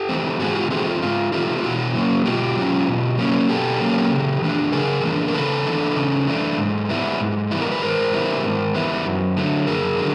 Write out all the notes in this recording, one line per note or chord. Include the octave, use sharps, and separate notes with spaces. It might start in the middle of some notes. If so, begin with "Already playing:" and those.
Already playing: G4 A4
E3 A3 C4
G#2 F#4 G#4
F4 G4
E3 A3 C4 F#4 G#4
F4
G#2 F4
E3 A3 C4 F4 G4
F4
B2 E4 F#4
F#3 A#3 C#4
B2 F4 G4
F#3 A#3 C#4
B2
F#3 A#3 C#4
B2 G4 A4
F#3 A#3 C#4
C#3
E3 A3 D4
C#3 G#4 A#4
E3 A3 D4
A#4
C#3 A4 B4
E3 A3 D4
C#3
E3 A3 D4
G#2
E3 G3 B3 E4
G#2
E3 G3 B3 E4
A#4
B4
G#2 A#4 C5
E3 G3 B3 E4
G#2
E3 G3 B3 E4
F#2
D3 F#3 A3
F#2 G#4 A#4
D3 F#3